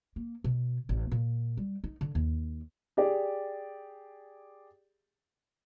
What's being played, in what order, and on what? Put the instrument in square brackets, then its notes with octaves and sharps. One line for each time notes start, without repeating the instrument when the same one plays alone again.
[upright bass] A#3
B2
A1
A#2
G3
D#4
D3
D#2
[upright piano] G4 G#4 D5